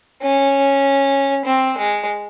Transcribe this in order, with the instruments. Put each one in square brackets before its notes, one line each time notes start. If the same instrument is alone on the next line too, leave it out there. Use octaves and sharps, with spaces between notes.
[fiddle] C#4
C4
G#3